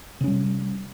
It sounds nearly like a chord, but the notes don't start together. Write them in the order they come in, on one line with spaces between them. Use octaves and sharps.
C3 C#4 G3